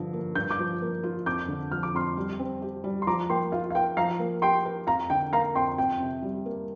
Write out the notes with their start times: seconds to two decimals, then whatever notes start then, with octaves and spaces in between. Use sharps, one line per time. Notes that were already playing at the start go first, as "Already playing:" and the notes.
Already playing: G2 D3 F3
0.13 A#3
0.35 G2 G6
0.51 D6 G6
0.59 F3
0.82 A#3
1.04 F4
1.26 F2 D6 G6
1.48 D3
1.72 F3 F6
1.83 D6
1.94 F2 C6 F6
2.17 G3
2.39 C4
2.62 G4
2.84 G3
3.02 C6
3.07 F3 A#5 D6
3.30 A#3 G5 C6
3.52 F4 F5
3.70 F5
3.75 A#4 G5
3.97 F3 F5 A#5
4.20 A#3
4.42 G4 G5 C6
4.65 A#4
4.87 F2 F5 A#5
5.10 D3 G5
5.33 A#3 F5 A#5
5.55 F2 G5 C6
5.78 F2 G5
6.00 C3
6.22 G3
6.46 A#3